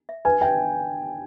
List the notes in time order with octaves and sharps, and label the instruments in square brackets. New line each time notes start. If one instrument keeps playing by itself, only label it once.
[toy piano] E5
[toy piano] B4 [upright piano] G#5
[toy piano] E5 [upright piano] G5